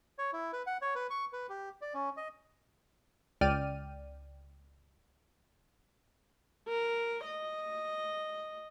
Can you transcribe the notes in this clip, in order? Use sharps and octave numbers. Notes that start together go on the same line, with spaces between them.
C#5
E4
B4
F#5
C#5
B4
C#6
B4
G4
D5
C#4
D#5
C#2 D5 G5 F6 D#7
A#4
D#5